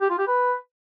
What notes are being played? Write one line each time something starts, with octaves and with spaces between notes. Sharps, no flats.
G4
F4
G4
B4